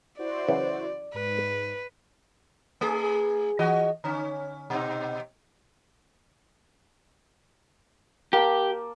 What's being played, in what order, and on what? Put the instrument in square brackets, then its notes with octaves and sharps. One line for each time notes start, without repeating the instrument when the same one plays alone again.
[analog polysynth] E4 F#4 C5 [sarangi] D5
[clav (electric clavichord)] C#3 E3 F#3
[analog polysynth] G#2 [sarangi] B4
[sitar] A3 G#4
E3 F#4 D#5
D3 C#4
B2 C4 D#4
[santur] A#3 A5 [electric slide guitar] G4